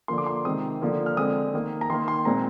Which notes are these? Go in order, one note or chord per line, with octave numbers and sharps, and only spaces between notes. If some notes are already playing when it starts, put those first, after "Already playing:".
D3 F3 A#3 C6
D6
C6
C3 D#3 G#3 C4 D#6
D3 F3 A#3
F6
D3 G#3 C4 D#6
D#3 A#3
A#5
D#3 A#3 C6
C6
A#2 G#3 C4 A#5